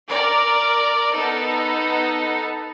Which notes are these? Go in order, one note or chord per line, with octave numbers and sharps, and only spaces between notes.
A#4 D5
B3 D#4 A4